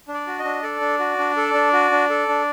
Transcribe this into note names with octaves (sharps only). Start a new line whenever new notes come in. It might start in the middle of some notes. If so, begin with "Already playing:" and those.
D4
D5
F#4
D#5
D4
A4 D5
D4
F#4
D4
A4
D4
F#4
D4
A4
D4